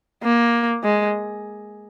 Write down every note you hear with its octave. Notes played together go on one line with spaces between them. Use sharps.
A#3
G#3